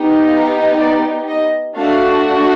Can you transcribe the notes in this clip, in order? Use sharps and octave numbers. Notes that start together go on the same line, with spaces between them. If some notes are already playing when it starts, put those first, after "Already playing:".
Already playing: B3 D#4 G4
F5
D5
D#5
A3 D4 F#4 F5